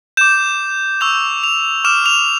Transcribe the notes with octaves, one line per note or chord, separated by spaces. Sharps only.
D6 G6 E7
C#6 E6 G6 F7
F7
D6 F6 E7
F7